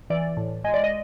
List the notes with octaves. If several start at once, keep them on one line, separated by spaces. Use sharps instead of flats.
E3 D5
A2
G#3 D#5
D5
D#5